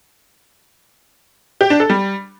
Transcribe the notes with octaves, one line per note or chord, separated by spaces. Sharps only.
G4
D4
A4
G3